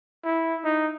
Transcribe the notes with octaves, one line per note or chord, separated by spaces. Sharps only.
E4
D#4